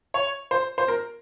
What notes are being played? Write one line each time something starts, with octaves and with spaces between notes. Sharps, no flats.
C#5
C5
C5
A#4